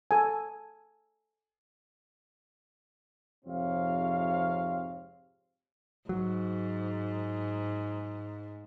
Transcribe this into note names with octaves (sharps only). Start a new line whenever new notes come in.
A4 G#5
F2 G#2 C3 C4 C#5 F5
G#2 F#3